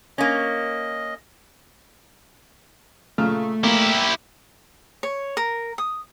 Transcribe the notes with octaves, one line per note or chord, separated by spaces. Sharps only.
A#3 C#4 D#5
A#2 C#3 A3 F6
A#3 E4 G4 F5
C#5
A#4
D#6